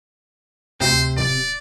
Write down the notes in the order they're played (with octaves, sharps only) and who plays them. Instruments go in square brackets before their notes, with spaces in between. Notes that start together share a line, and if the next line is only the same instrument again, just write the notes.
[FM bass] D2 [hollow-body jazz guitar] C3 [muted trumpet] C5
[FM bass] D1 [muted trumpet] D5